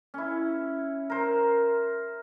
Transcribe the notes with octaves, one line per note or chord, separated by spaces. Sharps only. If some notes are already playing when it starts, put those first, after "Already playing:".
C#4 E4
A#4 C5